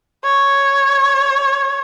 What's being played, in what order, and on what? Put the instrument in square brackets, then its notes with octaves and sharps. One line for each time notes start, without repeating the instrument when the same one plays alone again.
[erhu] C#5